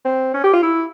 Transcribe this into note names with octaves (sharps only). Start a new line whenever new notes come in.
C4
C#4
G4
F4
E4